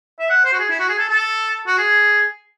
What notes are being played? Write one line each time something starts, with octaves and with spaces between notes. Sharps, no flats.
E5
F#5
C5
F#4
G#4
E4
F#4
G#4
A4
A4
F#4
G#4